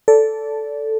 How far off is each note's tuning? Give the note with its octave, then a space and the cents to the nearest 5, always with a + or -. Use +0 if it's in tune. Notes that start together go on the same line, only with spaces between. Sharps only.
A4 +0 D5 -25